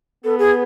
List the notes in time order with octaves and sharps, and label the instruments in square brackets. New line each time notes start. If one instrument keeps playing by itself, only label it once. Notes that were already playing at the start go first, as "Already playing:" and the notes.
[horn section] B3 [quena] A4
[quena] G#4